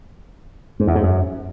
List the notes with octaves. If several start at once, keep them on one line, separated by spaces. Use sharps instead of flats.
G#2
E2
G#2
F#2